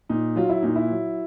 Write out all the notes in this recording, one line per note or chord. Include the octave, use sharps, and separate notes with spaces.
A#2 D#4
F#3 F4
E4
A#2 D#4
E4
F#3